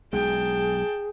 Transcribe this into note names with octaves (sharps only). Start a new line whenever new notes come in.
B1 G#3 G#4 G5 A5